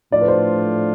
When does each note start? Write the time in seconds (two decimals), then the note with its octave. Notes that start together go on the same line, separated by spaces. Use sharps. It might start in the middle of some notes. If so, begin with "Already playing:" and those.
0.11 A2 F3 A3 D4 F4 D5
0.21 B4
0.28 C5